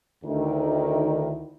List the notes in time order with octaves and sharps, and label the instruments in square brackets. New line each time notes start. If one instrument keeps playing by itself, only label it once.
[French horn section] D2 D#3 E4